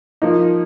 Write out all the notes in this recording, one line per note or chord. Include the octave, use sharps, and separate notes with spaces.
F3 A#3 D#4